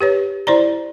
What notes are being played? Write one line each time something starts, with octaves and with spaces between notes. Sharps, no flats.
G4 B4 C#5
E4 C5 D5 A#5